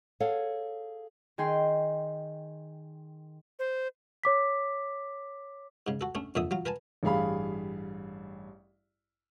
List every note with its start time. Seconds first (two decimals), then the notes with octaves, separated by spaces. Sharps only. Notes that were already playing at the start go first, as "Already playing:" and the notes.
0.20 G#4 A4 C#5 F5 F#5
1.38 D#3 G#4 G5 C6
3.59 C5
4.24 C#5 D6 B6
5.87 G#2 C#3
6.01 F#4 A4
6.15 A3 C#4 D4
6.35 F2 A#2 D3 D5 E5 D#6
6.51 F#3 F4
6.66 A#4 B4 G#5 A5
7.03 A1 G2 G#4 F5 B5